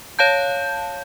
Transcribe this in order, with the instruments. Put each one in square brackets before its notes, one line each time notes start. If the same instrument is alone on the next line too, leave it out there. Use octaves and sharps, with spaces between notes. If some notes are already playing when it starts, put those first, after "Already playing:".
[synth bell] C#5 F5 A5 G6